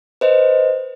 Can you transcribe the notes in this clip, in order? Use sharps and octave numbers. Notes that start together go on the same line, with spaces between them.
B4 C5 D#5